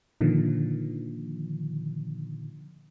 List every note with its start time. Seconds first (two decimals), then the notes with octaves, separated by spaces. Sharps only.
0.21 A#2 D3 D#3 F3